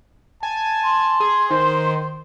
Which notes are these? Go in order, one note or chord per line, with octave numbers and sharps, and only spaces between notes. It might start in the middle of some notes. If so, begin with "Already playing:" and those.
G#5 A5
C6
G#4
D#3 C5